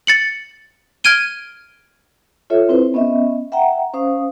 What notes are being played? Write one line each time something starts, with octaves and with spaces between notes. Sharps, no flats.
A6 C#7 F#7
F6 G#6 D7 D#7 G7
F4 A4 C#5 E5
C4 E4 B4 C5
B3 C#4 D#5 E5
E5 F#5 G5 A#5
C#4 C5 F5 D#6